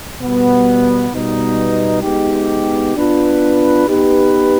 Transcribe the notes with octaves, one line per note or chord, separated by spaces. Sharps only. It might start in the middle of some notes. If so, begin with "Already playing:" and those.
B2 G3 B3
B2 G3 B3 D#4
G#3 B3 D#4 G4
B3 D4 F4 B4
B3 D#4 G4 B4